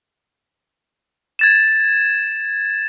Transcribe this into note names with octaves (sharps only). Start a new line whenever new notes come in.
G#6 A6 E7